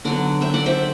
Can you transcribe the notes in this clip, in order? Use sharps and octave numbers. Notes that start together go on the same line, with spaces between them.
D3 F#3 B3 D5 F#5
E5 G5
D5 F#5
C5 E5